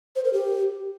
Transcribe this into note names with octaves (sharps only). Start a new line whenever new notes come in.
C5
A#4
G4